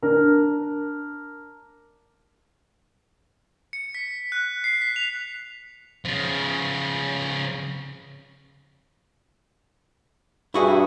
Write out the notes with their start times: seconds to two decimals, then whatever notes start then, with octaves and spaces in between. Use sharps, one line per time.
0.02 D4 A#4
3.73 C#7
3.95 B6
4.32 F#6
4.64 C7
4.81 B6
4.96 F7
6.05 C#3 F3
10.54 G2 E4 F#4 G#4